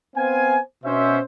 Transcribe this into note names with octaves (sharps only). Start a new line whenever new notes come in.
B3 C4 C5 F5 G#5
B2 C#4 C5 E5